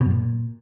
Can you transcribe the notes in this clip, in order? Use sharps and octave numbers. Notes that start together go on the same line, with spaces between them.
B2
F#2
A#2